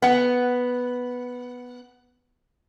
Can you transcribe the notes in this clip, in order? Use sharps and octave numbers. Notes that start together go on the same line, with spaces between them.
B3 F#5